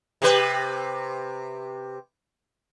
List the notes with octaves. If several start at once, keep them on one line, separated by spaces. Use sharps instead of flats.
C3 G4 B4